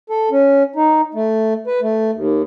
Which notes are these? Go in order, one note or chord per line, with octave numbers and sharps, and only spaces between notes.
A4
C#4
D#4
A3
B4
A3
D#2